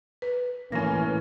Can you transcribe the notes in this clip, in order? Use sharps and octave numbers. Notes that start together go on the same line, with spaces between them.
B4
A2 E3 A#3 C#4 A#6